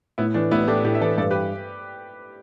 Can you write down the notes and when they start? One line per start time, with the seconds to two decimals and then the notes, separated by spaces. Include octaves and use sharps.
0.18 A2 B3 E4
0.34 E3 A3 D4
0.51 A1 B3 E4
0.67 A3 D4 G4
0.84 A2 D4 G4
0.95 E5
1.01 E3 A4 D5
1.18 G2 A4 D5
1.31 G4 B4